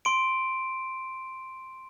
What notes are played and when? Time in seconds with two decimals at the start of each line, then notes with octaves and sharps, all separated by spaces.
0.05 C6 D7